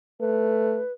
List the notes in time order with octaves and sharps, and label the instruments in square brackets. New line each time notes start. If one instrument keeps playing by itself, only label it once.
[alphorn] A3 [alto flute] B4